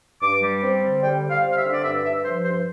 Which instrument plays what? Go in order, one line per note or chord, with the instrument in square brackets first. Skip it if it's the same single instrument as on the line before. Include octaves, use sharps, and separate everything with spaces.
[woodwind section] G2 D6
G3
C4
D3
G3 G5
G3
F5
C4
F5
E5
D3
D5
G2 E5
G2 E5
F3 C5
G2 C5